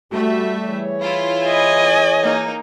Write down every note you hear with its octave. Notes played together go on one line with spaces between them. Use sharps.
G3 A3 F#4 E5
E3 G#4 C#5
E4 F4
D#5 G#5
A#3 D#4